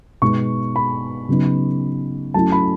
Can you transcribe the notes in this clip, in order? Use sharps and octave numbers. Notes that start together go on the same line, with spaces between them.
B2 G#3 B3 D#4 C#6
B5
C#3 F#3 B3 D#4
F#3 A3 C#4 E4 A5
B5